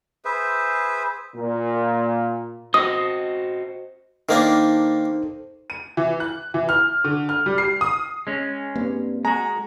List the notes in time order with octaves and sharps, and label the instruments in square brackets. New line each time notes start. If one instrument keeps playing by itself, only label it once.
[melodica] G#4 B4 C5 E5
[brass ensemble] A#2
[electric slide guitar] F#4 C5 D#5 [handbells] D#6
[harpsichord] D#3 A#3 D4 [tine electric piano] D#4 A4 C5
[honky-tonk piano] D#7
E3
F#6
E3
F6
D3
F6
G3
C7
D#6
[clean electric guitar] G#3 C#4
[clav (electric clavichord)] G2 [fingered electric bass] A#3 C4
[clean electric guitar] G#3 F#4 [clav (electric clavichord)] G#4 [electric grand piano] A#5